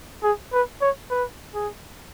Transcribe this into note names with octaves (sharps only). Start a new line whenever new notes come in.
G#4
B4
C#5
B4
G#4